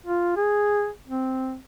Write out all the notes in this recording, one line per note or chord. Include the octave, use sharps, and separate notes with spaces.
F4
G#4
C4